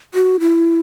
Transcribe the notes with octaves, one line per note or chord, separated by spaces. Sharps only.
F#4
E4